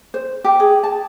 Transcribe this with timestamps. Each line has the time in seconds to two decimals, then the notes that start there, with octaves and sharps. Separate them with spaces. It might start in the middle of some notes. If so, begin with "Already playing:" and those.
0.14 C5
0.44 G4
0.60 G#4
0.83 A5